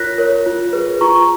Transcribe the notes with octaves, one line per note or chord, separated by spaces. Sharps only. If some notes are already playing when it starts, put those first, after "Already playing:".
Already playing: F4 A#4 C#5 F#6 A#6 B6
A#4 C#5
F4
G#4 B4
F4 A#5 C#6